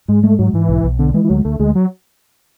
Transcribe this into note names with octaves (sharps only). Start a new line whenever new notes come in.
G#2 G#3
G#3 A3
G#2 F#3
G#2 E3
B1
B1
D3 B3
E3 G#3
E3
D2 F#3
D2 A3
D2 G#3
F#3